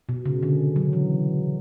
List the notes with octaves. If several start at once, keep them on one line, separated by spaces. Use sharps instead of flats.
B2
C#3
D3
F#3
E3